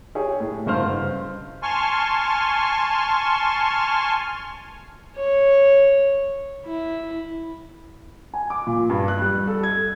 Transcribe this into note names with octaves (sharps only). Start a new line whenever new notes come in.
G4 G#4 C#5
A2
F#1 G2 C5 F6
G#5 A5 C6 C#6 F6
C#5
E4
G#5
D6
A#2
G2
F#6
G3
A4
G#6